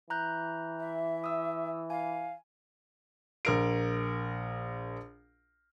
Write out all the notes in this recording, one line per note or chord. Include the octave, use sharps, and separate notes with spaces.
E3 A#5 F#6 G6
E5
D#6 E6
F5 G#5
A#1 A#4 D7